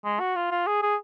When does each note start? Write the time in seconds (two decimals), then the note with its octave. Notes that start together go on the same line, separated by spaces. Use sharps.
0.05 G#3
0.20 F#4
0.36 F4
0.51 F4
0.67 G#4
0.82 G#4